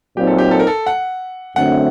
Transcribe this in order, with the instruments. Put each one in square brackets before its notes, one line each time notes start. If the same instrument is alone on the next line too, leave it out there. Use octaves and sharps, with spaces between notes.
[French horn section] A#2 F#3 C4 D#4 [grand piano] G4
[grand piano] A4
G4
A4
A#4
A4
F#5
[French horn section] F#2 D3 A3 C4 [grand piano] F#5